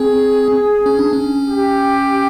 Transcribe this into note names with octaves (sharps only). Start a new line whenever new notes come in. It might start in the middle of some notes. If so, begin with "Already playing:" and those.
Already playing: C4 G#4
C#4
D4
C#4
G4